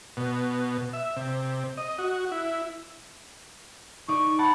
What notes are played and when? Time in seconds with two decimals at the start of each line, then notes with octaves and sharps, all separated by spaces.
0.17 B2
0.93 E5
1.16 C3
1.77 D#5
1.99 F#4
2.32 E4
4.08 D#4 D5 C#6
4.39 F#5 A5 B5 C#6